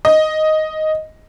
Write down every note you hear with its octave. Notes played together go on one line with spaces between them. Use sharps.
D#5